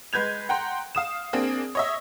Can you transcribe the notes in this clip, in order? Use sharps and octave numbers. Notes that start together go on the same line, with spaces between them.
G#3 B4 G6 G#6 F7
F#5 G5 A#5 C6
F5 D#6 E7
A#3 C4 D4 G#4
C#5 D#5 E5